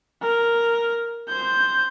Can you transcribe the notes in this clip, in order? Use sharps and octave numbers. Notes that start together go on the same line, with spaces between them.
A#4
C5 G6